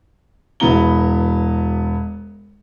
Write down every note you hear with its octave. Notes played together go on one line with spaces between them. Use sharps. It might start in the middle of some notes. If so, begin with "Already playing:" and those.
E1 B3 E4 A#5 G7